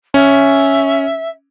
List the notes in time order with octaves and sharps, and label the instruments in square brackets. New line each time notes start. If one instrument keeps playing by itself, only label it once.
[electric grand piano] C#4 [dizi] E5